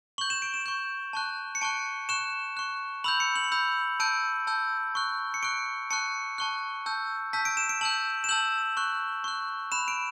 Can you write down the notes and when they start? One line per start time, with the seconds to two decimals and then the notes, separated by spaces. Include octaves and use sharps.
0.18 C#6 G6 F#7
0.30 E7
0.42 D7
0.54 E7
0.66 C#6 G6
1.13 A5 C#6 F#6
1.55 C#7
1.61 A5 C#6 F#6 D7
2.09 C#6 F#6 E7
2.57 C#6 F#6
3.04 B5 E6 G6 F#7
3.20 C#7
3.36 F#7
3.52 B5 E6 G6
4.00 A5 E6 G6 D7
4.47 A5 E6 G6
4.95 C#6 F#6
5.34 C#7
5.43 C#6 F#6 D7
5.91 A5 C#6 F#6 C#7
6.38 A5 C#6 F#6
6.86 A5 E6 G6
7.33 A5 E6 G6 B6
7.45 D7
7.57 E7
7.69 D7
7.81 A5 E6 G6 F#7
8.24 E7
8.29 A5 E6 G6 F#7
8.77 C#6 F#6
9.24 C#6 F#6
9.72 B5 F#6 E7
9.88 D7